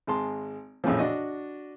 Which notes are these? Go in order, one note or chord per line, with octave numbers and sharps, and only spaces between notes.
G#1 G#3 A5 C6
A#1 F2 A2 C#3 E3 F3
D4 F#4 D#5